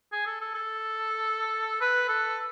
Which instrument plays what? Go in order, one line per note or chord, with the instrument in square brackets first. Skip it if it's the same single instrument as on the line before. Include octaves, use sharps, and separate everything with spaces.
[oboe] G#4
A4
A4
A4
B4
A4